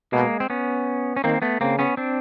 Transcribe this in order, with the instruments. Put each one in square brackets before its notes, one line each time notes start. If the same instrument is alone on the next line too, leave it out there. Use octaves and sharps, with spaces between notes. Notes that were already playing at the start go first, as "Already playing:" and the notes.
[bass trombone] B2 [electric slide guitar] G#3 A#3
[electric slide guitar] C4
B3 C#4
C#4
[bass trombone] D#3 [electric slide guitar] A#3 C4
[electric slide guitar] A3 B3
[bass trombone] C#3 [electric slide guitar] A#3 C4
[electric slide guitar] B3 C#4
C4 D4